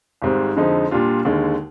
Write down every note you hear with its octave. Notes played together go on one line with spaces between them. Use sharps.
G#1 G#2 G3 C4
F2 D3 F3 G#3 D#4
A#2 G3 D4 F4
D#2 D3 G#3